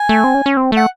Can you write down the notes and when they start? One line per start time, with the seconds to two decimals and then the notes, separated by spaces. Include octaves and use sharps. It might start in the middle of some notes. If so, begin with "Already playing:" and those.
Already playing: G#5
0.09 A3
0.24 C4
0.34 C#4
0.46 C#4
0.57 C4
0.72 A3 F#5